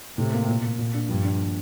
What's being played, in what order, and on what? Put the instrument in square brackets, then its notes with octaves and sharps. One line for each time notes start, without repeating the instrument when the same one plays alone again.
[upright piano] A2 [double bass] C3
[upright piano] A#3
A#2
A#3
A#2
D4
[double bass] G2 [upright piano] F3
[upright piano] D4